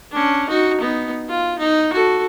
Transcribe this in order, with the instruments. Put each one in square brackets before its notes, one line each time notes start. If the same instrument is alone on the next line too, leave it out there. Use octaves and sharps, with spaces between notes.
[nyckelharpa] C#4 D4
D#4 F#4
B3 D#4
F4
D#4
F#4 A4